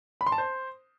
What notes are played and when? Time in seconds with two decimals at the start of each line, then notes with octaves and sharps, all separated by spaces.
0.21 B5
0.27 C6
0.32 A5
0.38 C5